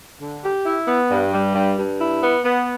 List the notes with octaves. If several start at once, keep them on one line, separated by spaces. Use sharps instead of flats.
D3
G4
E4
B3
G2
G3
G2
G2
E4
B3
B3